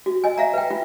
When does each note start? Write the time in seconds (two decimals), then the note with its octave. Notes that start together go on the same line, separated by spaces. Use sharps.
0.06 F#4
0.24 D#5 G#5
0.38 E5 F5 A#5
0.54 B4 G5
0.71 F4